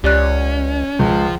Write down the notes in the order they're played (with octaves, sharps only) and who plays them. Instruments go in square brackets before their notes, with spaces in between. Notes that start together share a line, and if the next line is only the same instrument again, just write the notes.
[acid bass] C#2 [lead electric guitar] C#4 [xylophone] G4 D5 F#6
[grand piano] C#2 [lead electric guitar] F3